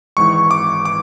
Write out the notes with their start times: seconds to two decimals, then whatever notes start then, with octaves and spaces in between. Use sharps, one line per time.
0.17 G#1 G#2 E3 C#6
0.51 D6
0.85 D6